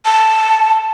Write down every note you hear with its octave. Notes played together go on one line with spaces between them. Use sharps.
A5